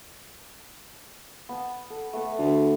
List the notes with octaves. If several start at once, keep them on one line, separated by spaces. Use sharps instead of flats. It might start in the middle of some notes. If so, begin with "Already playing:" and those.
B3 A5
A4
A3 B3 A4
D2